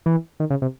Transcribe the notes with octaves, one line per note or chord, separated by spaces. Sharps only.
E3
D#3
C#3
C3